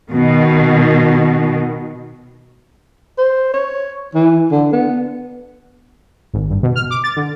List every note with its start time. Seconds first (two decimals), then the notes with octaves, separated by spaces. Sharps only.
0.12 B2 D#3
3.18 C5
3.54 C#5
4.15 E3
4.52 D3
4.72 B3
6.33 G#1
6.50 G2
6.63 B2
6.76 F6
6.91 D6
7.04 A6
7.16 D3